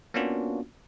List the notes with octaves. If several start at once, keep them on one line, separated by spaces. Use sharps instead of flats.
A#3 B3 C#4 D4 F4 F#4